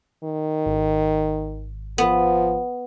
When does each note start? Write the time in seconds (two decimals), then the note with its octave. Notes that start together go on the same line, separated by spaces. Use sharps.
0.24 D#3
0.66 G#1
1.98 F3 B3